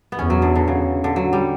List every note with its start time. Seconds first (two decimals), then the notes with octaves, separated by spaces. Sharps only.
0.12 B3
0.18 E2 C#4
0.30 F#3
0.42 D3
0.55 D3
0.68 C#3
1.04 D3
1.16 F#3
1.33 G3